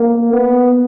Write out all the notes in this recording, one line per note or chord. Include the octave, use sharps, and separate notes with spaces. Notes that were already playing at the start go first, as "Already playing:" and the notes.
Already playing: A#3
B3